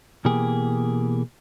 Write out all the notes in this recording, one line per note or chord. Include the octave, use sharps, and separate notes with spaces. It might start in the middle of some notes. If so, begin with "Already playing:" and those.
B2 E3 A#3 G4 G#4